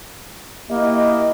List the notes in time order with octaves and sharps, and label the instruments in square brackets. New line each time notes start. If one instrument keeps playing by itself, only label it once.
[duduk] A#3 [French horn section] E4 G4 D#5